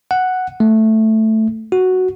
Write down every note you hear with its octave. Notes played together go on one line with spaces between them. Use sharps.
F#5
A3
F#4